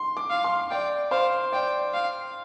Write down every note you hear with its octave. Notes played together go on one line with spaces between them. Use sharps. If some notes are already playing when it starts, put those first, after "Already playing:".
Already playing: C6
D6
F5
C6
D5 G5
C5 F5
D5 G5
F5